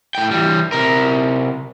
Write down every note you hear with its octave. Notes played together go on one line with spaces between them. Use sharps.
A2 G5
E3 G3
C3 A#4